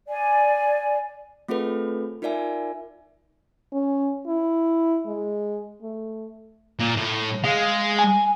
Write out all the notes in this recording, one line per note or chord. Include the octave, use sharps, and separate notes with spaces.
D5 G#5
A3 C4 F4 G#4 A4 B4
D#4 F4 A#4 D5 E5 G#5
C#4
E4
G#3
A3
A#2
A2
G#3 F5
G#5